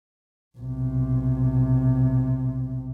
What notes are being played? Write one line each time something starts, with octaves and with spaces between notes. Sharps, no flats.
B1 C3